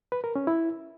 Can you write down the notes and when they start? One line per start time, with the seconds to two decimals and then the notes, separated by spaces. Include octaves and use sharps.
0.12 B4
0.24 A#4
0.35 C#4
0.47 E4